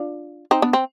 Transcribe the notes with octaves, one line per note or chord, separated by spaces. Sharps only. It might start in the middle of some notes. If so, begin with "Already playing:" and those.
Already playing: D4 F4
C4 D#4
B3 D4
C4